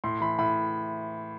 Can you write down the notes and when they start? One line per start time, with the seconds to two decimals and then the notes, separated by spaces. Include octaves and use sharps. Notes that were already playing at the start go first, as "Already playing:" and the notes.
0.04 A2 C6
0.21 E3 B5
0.39 A2 B5